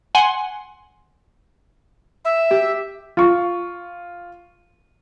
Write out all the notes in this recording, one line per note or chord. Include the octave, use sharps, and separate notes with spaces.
F#5 G#5 C6
E5
G4
F4 C#6